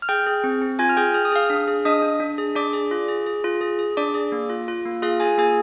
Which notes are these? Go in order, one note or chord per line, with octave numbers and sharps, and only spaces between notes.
F6
G#4 G5 G6
G#4
C4
C4
F4 G#5 G#6
F6
G#4 G5 G6
G#4 F6
D#6
G#4 F5 F6
D4
G#4
D4 D#5 D#6
D4
D4
G#4
D4 D5 D6
G#4
F4
G#4
G#4
F4
G#4
G#4
D4 D5 D6
G#4
A#3
F4
F4
A#3
F4 G#4 F5
F4 G#4 G#5
A#3 G#4 G#5